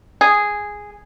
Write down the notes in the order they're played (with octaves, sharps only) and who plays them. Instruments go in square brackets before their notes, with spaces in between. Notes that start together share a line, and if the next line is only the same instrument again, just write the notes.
[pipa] G#4